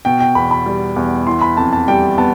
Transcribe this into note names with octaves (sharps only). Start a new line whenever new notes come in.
B2 G5
G5
E2 B5
B5
G3
E2
E3 C6
B5
F2 A5
A5
G3 G5
B3 A5